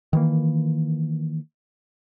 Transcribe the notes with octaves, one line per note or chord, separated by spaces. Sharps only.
D#3 E3 A#3